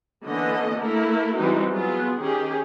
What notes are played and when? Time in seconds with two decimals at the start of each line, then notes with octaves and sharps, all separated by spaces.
0.24 D3 E3 A#3 B3 C#4 D#5
0.78 A3 A#3 E4 A4 A#4
1.35 E3 G3 G#3 C4 D#4 F#4
1.70 F#3 B3 F4 G#4
2.16 D#3 C#4 G4 G#4